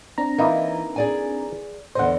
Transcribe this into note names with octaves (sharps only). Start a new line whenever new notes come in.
C4 D4 A#5
E3 A#3 D#4 E4
G#4 D5 G#5
E2 D3 C5 D#5 F#5